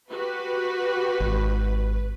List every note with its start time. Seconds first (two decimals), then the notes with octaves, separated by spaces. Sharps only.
0.10 F#4 G4 B4
1.20 G#1